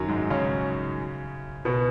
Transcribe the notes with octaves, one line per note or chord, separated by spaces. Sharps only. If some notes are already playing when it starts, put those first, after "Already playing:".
Already playing: F#2 D#3 F#3
G#2 G#3
C#3 C#4
B2 B3